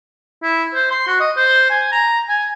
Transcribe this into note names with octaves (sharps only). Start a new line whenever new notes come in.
E4
C5
C6
F#4
D#5
C5
G#5
A#5
G#5